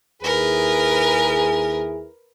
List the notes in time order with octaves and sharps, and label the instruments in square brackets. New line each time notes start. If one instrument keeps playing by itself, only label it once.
[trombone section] D#2 E4 G#4 [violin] A#4 B4